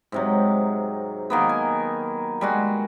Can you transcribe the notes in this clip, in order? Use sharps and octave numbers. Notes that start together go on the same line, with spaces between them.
G#2 C3 F#3
D#3 A#3 B3
G#5
G3 G#3 F#4